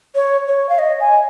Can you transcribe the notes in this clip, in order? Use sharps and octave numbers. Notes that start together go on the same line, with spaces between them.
C#5
C#5
F5
D#5
G#5